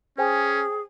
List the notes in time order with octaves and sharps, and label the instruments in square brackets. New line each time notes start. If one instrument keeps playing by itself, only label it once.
[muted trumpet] C#4 [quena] G#4 [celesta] C5 G5 G#5